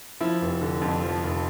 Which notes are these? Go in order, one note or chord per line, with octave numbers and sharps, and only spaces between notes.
F3 E4
F1
D3
F2
F3
F1